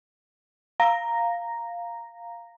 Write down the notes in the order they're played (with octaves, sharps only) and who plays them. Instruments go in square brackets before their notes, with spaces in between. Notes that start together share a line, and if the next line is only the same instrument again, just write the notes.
[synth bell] F5 A#5 A#6